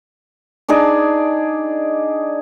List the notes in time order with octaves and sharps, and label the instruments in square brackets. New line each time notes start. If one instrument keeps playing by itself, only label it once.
[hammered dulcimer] D4 D#4 G#4 D5